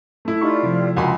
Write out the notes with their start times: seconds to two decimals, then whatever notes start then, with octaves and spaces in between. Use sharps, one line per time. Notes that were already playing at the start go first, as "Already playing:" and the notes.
0.25 A3 E4
0.41 D#4 F4 G4 D5 B5 C#6
0.63 C3 F3
0.97 C#2 F#4 A#4 G#5 B5 C6